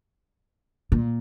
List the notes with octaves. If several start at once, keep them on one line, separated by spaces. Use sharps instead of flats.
A#2